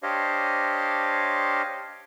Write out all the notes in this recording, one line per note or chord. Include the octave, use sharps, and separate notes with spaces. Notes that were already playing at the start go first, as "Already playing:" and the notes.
D4 G4 C5 C#5 D#5 F5